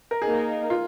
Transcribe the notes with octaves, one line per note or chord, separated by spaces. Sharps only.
A#4
A#3 D#4 G#4 A#4
F4